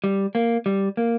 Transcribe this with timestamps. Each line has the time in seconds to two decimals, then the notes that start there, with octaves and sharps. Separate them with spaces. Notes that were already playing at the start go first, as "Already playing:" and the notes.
0.04 G3
0.35 A#3
0.66 G3
0.97 A#3